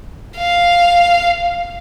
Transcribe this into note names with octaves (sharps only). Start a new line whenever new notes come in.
F5